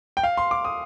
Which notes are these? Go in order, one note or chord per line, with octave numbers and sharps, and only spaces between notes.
G5
F5
C6
D6
D#6